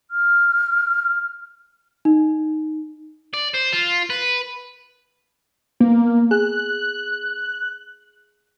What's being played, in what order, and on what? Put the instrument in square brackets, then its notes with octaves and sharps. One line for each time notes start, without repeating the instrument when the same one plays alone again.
[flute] F6
[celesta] D#4
[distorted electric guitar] D5
C5
F4
B4
[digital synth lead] A#3 [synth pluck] B3
[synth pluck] G#4 [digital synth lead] F#6